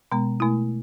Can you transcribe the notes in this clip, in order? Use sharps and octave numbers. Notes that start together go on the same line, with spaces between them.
B2 G#3 B3
B2 A3 E4